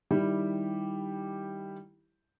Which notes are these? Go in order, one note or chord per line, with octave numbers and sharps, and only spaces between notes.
D#3 G3 E4 G4